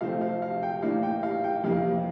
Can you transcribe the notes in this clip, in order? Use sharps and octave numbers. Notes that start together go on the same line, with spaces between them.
C3 F3 A3 C4 F5
F5
F5
G5
A2 E3 A#3 D4 F5
G5
F5
G5
F2 C3 E3 G3 A#3 F5